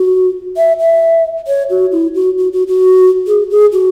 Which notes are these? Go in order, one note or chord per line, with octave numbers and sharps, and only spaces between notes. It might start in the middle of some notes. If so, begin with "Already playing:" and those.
Already playing: F#4
E5
E5
C#5
F#4
E4
F#4
F#4
F#4
F#4
G#4
G#4
F#4